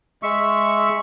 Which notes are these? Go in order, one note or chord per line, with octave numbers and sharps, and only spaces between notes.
G#3 E5 C#6